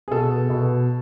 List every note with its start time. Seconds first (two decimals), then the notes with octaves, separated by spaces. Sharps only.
0.08 G#4
0.11 B2 A4
0.50 B2